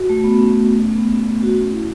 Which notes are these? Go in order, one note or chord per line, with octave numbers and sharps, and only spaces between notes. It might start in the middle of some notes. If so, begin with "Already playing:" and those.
Already playing: F#4
A3
B3
C#4
B3
A3
B3
C#4
F#4
E4